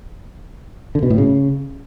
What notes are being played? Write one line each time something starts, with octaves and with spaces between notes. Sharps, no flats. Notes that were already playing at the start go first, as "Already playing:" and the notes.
D3
B2
A2
C#3